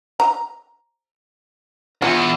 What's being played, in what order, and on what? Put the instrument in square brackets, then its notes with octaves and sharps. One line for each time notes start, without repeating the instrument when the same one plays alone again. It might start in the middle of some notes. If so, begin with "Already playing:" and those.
[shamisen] A#5
[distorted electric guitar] E2 [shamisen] F4